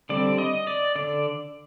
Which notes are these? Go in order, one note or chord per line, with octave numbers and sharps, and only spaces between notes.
D3 G3 C4 D5
D#5
D5
D3 D5